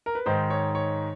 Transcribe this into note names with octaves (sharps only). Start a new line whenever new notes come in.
A#4
B4
G#2 D#3 C5
C#5
C#5